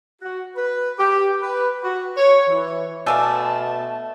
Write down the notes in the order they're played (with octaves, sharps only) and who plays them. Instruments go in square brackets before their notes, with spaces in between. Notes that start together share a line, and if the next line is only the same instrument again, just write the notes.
[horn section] F#4
B4
G4
B4
F#4
C#5
E3
[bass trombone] B2 [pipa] A3 D5 F5 [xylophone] G#5 E6 D#7 [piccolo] A5